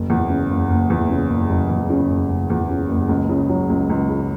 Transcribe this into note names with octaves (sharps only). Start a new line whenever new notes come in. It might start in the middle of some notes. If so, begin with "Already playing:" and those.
Already playing: F#1
E2
C#3
F#1
F#1
E2
C#3
F#1
F#1
E2
C#3
F#1
F#1
E2
C#3
F#1
C#2
C#3
F#3
C#2
C#2
C#3